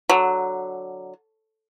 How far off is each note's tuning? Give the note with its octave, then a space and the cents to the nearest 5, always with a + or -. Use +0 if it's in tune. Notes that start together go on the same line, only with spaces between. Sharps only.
D3 +0 F#3 +0